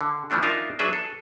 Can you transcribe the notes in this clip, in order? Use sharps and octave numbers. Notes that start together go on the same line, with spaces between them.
D3
E3 F3 A3 D4 F#4
D4 D#4 F4 A#4 E5
F#3 D4 G#4 B4 E5
A4